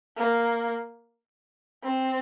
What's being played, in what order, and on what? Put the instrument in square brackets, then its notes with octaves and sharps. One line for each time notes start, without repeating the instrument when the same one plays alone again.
[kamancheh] A#3
C4